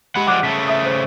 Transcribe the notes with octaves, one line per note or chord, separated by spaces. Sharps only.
G#3 G4 F#5 B5
F3 G3 G#3 F#5 D6 F#6
C#3 A3 B6
E5 D#6
C5